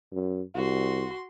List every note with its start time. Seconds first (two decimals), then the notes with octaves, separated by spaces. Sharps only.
0.12 F#2
0.56 C2 F#4 C6